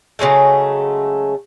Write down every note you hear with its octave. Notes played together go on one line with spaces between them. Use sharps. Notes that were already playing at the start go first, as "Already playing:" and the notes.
C#3 F#3 G#3 A3